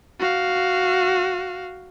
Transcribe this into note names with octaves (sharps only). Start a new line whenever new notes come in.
F#4 F5